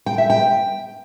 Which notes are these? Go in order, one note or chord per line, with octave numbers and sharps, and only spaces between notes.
G5
E5
G5